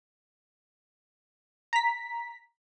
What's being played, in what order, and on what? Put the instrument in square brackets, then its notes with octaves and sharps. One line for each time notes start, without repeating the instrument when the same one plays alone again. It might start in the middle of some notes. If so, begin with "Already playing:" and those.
[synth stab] A#5 B6